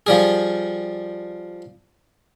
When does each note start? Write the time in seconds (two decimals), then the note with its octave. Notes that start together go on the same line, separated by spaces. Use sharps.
0.07 F3 G3 G#4